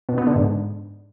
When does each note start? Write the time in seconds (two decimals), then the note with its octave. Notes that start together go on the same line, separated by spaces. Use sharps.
0.09 B2
0.18 B3
0.27 D3
0.36 G#2